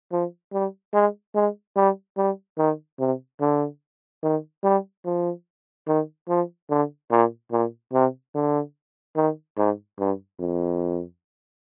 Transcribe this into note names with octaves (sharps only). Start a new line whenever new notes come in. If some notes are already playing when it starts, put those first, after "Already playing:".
F3
G3
G#3
G#3
G3
G3
D#3
C3
D3
D#3
G3
F3
D#3
F3
D3
A#2
A#2
C3
D3
D#3
G#2
G2
F2